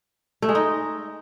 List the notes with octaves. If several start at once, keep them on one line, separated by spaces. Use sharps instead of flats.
A3
G#3
D#4